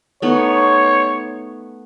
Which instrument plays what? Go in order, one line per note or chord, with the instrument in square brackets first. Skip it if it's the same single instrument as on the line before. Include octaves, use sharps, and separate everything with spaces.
[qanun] A3 B3 D#4 [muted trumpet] C#5